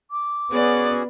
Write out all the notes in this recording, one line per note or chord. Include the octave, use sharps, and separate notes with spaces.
D6
B3 C#4 F#4 G#4 D5